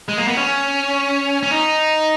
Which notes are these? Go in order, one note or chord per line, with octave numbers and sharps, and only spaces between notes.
G#3
A#3
B3
C#4
C#4
D#4